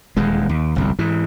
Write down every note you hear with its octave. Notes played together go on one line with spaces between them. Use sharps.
D#1 E2 G#3
D#2
G1 C2 F2
G#2 E3